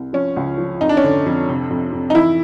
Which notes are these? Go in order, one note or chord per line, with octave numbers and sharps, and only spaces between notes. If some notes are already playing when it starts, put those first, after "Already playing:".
Already playing: C2
F3 C#4
C#2
F3
F2 D#4
D4
C#4
D3 D4
F2
C3
F2
F2
D#4
E3 E4